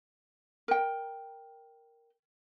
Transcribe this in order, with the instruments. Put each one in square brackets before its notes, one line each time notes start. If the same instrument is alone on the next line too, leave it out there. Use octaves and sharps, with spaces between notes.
[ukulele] A#4 G5